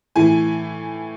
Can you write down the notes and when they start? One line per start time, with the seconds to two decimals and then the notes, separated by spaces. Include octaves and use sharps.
0.16 A2 E3 G#5